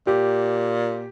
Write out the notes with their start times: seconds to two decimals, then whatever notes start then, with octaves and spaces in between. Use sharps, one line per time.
0.07 A#2 G4